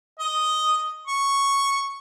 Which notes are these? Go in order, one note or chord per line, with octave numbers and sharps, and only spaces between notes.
D#5
C#6